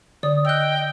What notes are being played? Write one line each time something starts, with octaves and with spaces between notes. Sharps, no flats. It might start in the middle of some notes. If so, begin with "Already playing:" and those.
D3 D5 D#6
D#5 G5 E6 F#6